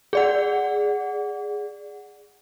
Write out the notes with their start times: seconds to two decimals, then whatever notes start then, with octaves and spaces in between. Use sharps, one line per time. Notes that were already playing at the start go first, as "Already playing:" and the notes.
0.13 G#4 D5 F#5